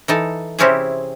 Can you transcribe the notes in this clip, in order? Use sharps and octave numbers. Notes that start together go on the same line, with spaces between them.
E3 D#4 A4
C3 C4 C#4 E4 G4 G#4